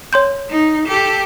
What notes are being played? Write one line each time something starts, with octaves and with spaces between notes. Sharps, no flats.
C#5 C6 G6
D#4
G4 A4